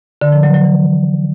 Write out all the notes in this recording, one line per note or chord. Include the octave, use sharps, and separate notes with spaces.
D3
F3
F#3
F#3
E3